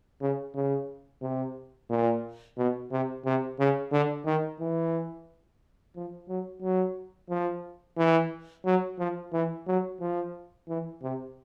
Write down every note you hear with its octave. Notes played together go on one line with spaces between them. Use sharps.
C#3
C#3
C3
A#2
B2
C3
C3
C#3
D3
D#3
E3
F3
F#3
F#3
F3
E3
F#3
F3
E3
F#3
F3
E3
C3